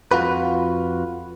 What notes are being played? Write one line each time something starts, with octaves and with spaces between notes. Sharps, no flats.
F2 F4 F#4 B4